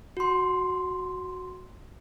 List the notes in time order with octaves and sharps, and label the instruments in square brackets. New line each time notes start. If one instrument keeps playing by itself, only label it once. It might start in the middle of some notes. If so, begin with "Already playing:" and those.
[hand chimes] F#4 C6